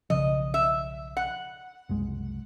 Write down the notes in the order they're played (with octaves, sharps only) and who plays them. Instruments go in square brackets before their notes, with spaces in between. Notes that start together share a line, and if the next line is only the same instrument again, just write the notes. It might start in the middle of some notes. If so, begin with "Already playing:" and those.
[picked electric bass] B1 C#3 F3 [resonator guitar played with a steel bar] D#5
[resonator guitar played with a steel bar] E5
F#5
[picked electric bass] F#1 C2 G#3